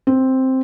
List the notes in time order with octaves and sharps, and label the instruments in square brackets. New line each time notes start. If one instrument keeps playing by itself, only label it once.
[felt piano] C4